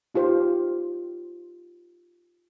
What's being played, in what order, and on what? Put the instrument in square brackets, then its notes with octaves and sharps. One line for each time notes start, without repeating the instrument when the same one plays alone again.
[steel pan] D#4 F4 G4 C5